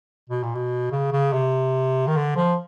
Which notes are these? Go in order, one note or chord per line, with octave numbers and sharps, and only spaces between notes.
B2
A#2
B2
C#3
C#3
C3
D#3
D3
F3